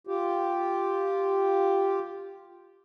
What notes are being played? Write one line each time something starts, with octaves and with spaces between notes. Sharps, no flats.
F4 G4